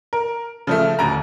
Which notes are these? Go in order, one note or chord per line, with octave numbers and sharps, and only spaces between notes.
A#4
C#3 F3 A3
D#1 D2 A#5